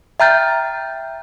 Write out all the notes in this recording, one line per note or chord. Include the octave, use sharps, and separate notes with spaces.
E5 G5 A#5 F6 G6 A6